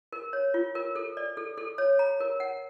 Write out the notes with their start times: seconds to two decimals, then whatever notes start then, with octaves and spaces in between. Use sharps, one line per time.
0.13 A#4
0.33 C#5
0.54 F4
0.75 A#4
0.96 A4
1.17 D5
1.37 A4
1.58 A4
1.78 C#5
1.99 A#5
2.20 A#4
2.40 F#5